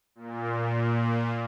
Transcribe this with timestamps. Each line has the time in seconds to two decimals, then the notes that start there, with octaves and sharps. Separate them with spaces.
0.15 A#2